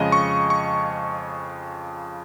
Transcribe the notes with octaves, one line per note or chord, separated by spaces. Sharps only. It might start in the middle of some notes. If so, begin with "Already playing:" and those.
Already playing: F2 C#3 G#3 C#4 G#4 D#5
C#6
C#6